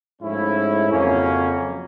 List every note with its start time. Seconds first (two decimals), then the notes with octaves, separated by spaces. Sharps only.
0.22 G#2 F3 A3 C#4 E4
0.90 F2 C#3 F#3 A#3 C#4